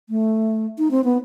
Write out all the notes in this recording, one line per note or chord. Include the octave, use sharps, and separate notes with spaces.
A3
D#4
C4
B3